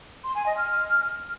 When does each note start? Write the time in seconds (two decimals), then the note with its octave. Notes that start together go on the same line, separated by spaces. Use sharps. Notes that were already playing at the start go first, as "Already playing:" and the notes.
0.24 C6
0.35 G#5
0.46 D#5
0.57 F6